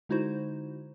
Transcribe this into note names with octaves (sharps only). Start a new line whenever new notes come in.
D3 G#3 D#4 E4 F#4 C5